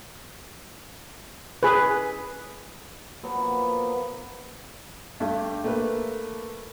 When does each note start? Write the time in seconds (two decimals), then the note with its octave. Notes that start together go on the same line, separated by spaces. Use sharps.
1.63 G#4 B4
3.23 F3 F#3 A#3 B3
5.20 G2 A3 G4
5.64 A3 A#3 B4